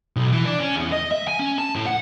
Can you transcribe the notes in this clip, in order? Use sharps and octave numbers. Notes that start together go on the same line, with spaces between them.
B1
E3
D4
C#4
E2
D#5
E5
G#5
C#4
A5
A2
F#5